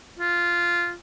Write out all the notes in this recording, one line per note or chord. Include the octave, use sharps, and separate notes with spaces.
F4